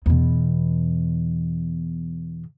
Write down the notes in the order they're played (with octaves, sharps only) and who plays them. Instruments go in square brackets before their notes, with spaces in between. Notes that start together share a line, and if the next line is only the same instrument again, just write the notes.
[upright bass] E2 B2